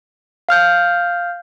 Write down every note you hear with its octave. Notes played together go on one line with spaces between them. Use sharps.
F5 F6 G6